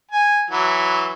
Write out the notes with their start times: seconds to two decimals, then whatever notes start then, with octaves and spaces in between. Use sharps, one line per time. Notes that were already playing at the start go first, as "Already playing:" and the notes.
0.11 G#5
0.50 E3 F#3